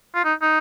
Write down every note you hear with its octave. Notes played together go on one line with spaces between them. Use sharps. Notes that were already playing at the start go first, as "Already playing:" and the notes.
F4
D#4
D#4